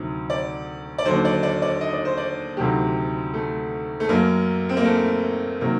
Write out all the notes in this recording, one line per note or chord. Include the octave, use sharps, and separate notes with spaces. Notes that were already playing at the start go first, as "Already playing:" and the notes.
Already playing: D2 C3 D#3 F#3
D5
D5
D#2 D3 F#3 C5
D5
D5
D5
D#5
D5
C5
D5
D2 C3 D#3 F#3 G4
A3
A3
F#2 F#3 A#3
C4
A#3
A3
C3 D#3 F#3 A#3